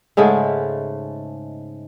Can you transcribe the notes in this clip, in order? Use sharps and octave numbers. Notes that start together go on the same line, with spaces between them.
G#2 C#3 G#3 A3